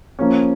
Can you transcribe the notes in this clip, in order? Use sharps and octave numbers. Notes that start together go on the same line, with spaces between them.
F3 A#3 C#4